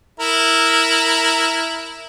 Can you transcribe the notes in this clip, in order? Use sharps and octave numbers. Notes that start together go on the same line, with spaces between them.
E4 A#4